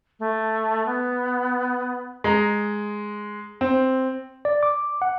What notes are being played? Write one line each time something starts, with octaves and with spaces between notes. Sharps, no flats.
A3
B3
G#3 A#5
C4
D5
D6
F#5